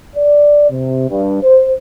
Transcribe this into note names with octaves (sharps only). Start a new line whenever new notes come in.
D5
C3
G2
C5